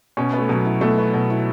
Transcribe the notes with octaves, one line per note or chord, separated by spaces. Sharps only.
B2 C#4
B3
A3
B2 F#3
E4
B2 A3
B3
B2
E4